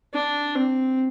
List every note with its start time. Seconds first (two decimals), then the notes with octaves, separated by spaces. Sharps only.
0.14 D4
0.55 C4